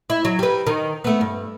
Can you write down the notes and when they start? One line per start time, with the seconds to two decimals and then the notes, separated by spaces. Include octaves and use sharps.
0.10 E4
0.25 F#3
0.39 G3 B4
0.67 D#3
1.04 A3 B3
1.21 G2